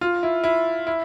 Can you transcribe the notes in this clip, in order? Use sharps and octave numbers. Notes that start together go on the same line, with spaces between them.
F4
E4
E4
E4